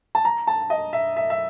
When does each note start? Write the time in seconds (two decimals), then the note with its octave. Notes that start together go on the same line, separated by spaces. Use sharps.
0.15 A5
0.25 A#5
0.47 A5
0.70 D#5
0.93 E5
1.17 E5
1.30 E5